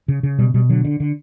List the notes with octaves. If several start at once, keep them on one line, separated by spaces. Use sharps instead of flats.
C#3
C#3
B2 G3
B2 G3
D3 F#3
D3
D3